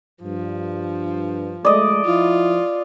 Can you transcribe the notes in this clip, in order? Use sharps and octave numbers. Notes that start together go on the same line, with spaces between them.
G2 F3
G#3 A3 D5 D#5
F3 E4 F4